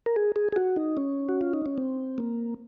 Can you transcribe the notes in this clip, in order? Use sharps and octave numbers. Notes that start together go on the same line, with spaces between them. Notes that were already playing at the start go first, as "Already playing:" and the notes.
A#4
G#4
G#4
G#4
F#4
D#4
C#4
F#4
F4
D#4
C#4
C4
A#3